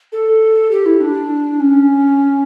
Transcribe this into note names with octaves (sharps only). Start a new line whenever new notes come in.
A4
G4
E4
D4
C#4